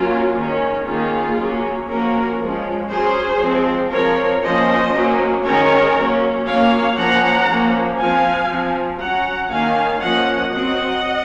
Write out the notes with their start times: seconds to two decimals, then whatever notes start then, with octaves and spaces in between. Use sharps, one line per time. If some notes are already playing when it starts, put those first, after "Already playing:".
Already playing: F#3 A#3 C#4 F4
0.36 D#3 G#3 C#4
0.87 D#3 A#3 C#4 F4 G#4
1.38 F#3 A#3 C#4
1.89 F3 A#3 C#4 F#4 A#4
2.39 F3 G#3 C#4
2.90 F#3 C#4 G#4 C5
3.41 F3 G#3 C4
3.92 F3 C4 A#4 C#5
4.43 F3 A#3 C#4 C5 D#5
4.94 F#3 A#3 C#4
5.45 D#3 G#3 C#4 A#4 C#5
5.96 F#3 A#3 C#4
6.46 F#3 A#3 C#4 C#5 F5
6.97 F3 A#3 C#4 F#5 A#5
7.48 F3 A#3 C#4
7.98 F3 C4 F5 G#5
8.49 F3 C4
9.00 F#3 C#4 F#5 A#5
9.51 D#3 A#3 C#4 F5 G#5
10.02 F3 A#3 C#4 D#5 F#5
10.53 F#3 C4 D#5 F#5